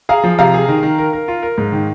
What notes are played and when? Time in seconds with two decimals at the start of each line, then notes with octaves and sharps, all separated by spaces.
0.09 G#4 F5 A#5
0.24 F3
0.39 C3 F5 A#5
0.54 G#4
0.68 D#3
0.83 D#3
0.98 A#4
1.13 A#4
1.28 F4
1.43 A#4
1.58 G#2
1.72 D#3